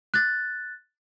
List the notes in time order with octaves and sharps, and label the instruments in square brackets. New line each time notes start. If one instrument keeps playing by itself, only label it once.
[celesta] F#6 A6